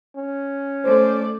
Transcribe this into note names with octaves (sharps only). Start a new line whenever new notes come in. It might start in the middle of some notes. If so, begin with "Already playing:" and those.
C#4
A3 C5 D5